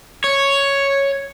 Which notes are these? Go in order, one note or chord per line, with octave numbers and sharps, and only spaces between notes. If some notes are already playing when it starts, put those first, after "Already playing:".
C#5